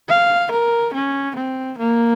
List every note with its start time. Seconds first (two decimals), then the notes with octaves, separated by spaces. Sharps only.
0.09 F5
0.52 A#4
0.94 C#4
1.36 C4
1.78 A#3